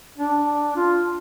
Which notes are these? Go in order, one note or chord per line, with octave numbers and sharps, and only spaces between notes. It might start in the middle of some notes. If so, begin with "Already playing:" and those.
D4
F4